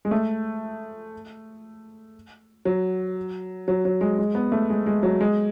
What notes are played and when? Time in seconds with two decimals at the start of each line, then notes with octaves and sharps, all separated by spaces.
0.05 G#3
0.11 A3
2.65 F#3
3.68 F#3
3.85 F#3
4.01 G#3
4.19 G#3
4.35 B3
4.52 A3
4.70 G#3
4.86 G#3
5.03 F#3
5.21 G#3